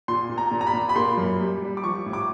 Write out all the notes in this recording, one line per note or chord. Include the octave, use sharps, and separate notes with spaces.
A#2 C6
A#2
A#5
A#2
A#5
B5
A#2
B5
A#3 C6
F#2
G3
G3
D6
F3 C#6
A2
D6